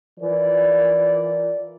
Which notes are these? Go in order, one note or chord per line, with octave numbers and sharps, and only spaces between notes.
E3 F4 A#4 D5